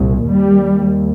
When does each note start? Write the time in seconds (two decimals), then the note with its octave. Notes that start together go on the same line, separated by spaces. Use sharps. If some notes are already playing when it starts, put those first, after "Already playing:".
Already playing: C2 A#2
0.27 D#2 G3